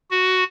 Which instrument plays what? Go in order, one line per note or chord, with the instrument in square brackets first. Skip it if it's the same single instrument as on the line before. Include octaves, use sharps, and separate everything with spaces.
[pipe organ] F#4